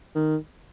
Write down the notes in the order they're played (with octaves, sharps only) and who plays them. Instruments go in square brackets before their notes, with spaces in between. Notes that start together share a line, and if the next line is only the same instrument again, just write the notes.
[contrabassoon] D#3